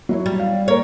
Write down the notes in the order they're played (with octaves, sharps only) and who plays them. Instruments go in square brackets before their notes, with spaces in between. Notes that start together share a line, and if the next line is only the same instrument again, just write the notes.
[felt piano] F#3 E4 C#5
[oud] G3
[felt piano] F5
[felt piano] A#3 A#4 [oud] C#5